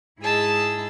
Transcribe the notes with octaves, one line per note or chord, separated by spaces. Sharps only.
G#2 E4 G#4 D#5 A5 E6